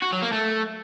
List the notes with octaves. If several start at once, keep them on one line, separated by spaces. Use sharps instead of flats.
F#4
F#3
A#3
A3